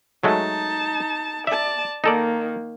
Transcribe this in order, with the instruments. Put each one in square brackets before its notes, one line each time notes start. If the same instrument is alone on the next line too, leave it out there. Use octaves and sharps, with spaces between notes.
[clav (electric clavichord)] F#3 G#3 A3 [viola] D#4 A5
[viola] D5 A5 [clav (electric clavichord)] E5
[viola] D#3 A#3 [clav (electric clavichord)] D#4 A4 D5